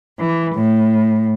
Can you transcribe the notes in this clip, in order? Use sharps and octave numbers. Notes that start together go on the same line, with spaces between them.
E3
A2